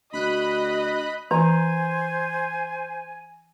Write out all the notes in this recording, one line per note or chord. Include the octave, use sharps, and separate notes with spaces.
D2 F#4 D#5 B5 F#6
E3 C5 G#5 A#5